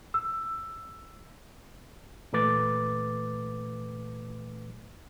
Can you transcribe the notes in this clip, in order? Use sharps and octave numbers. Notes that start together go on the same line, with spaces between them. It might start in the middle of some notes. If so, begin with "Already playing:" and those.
E6
A#2 E3 A3 B4 D6 A6